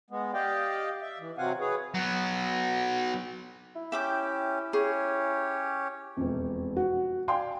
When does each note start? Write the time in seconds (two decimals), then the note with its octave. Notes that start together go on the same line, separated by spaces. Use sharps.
0.10 G#3 B3
0.33 G4 D5 D#5 F5 G5
1.02 E5
1.19 E3
1.38 C3 F#3 C4 F5 F#5 G#5
1.60 G#4 B4 C#5
1.94 F#3 B3
3.76 E4
3.92 C#4 G4 E5 G5 D6
4.73 C#4 G4 G#4 C#5
6.17 E1 F2
6.77 F#4
7.28 D5 F5 G5 G#5 C6